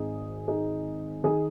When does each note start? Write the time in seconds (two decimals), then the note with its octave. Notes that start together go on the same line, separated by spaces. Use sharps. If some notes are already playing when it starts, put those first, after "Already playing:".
Already playing: G#1 G#2 D#3 D#4 G#4
0.48 D#4 G#4
1.24 D#3 D#4 G#4